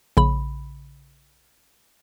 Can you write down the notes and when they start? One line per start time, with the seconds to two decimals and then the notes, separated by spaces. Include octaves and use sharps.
0.17 A#1 C#3 B5